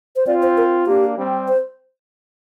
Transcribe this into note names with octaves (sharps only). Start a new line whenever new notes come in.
C5
C4 F4 D5
C5
A#4
A#3 D4 G4
G3 C4
C5